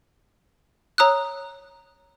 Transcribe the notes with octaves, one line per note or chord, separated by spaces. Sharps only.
C#5 A#5 D#6 E6 F#6